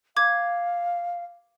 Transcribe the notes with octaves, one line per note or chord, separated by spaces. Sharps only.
F5 D6 G#6